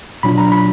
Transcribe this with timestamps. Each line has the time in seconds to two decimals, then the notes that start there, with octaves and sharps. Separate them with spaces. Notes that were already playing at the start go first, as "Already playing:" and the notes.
0.23 B2 F#3 D4 F4 B5
0.38 A#5
0.52 B5